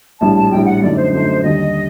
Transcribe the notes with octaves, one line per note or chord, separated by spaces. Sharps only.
A#1 A2 G3 A5
A5
A#1 A2 G3 G5
F#5
F#2 D3 A3 D#4 D5
C5
F#2 D3 A3 D#4 C5
D#2 D3 G3 D#5